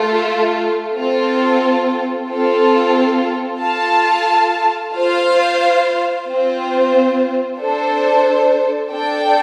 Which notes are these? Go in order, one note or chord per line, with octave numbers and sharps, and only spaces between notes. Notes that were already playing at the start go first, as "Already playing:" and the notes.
Already playing: A3 F4 A4
C4 F4 A4
C4 F4 A4
F4 A4 F5 A5
F4 C5 F5
C4 F4 C5
D4 A4 C5
D4 A4 D5 G5